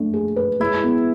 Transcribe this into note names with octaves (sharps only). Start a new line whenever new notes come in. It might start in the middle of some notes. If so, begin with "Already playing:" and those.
Already playing: A3 D4
G#4
B4
G#3 E4
B3